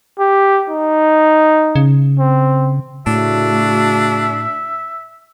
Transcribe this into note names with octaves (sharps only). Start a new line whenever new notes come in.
G4
D#4
C#3
C4
A2 C#3 A3 D4 F#4 E5